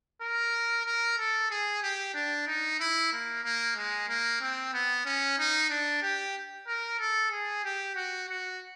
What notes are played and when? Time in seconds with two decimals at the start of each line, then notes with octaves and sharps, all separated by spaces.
0.22 A#4
0.86 A#4
1.18 A4
1.50 G#4
1.83 G4
2.14 D4
2.47 D#4
2.80 E4
3.12 A#3
3.44 A#3
3.76 G#3
4.08 A#3
4.41 C4
4.73 B3
5.05 C#4
5.38 D#4
5.70 D4
6.02 G4
6.67 A#4
6.99 A4
7.31 G#4
7.64 G4
7.96 F#4
8.29 F#4